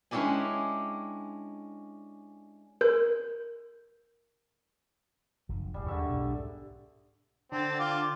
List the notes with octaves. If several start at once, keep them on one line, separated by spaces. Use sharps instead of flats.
G#3 C#4 D4 E4 G4 G#5
A#4 G6
F#1 D3 F3
D1 G3 G#4
D#2 D3 G#3 E5 C#6
B1 G#2 B2
D3 C4 A6
F4 D6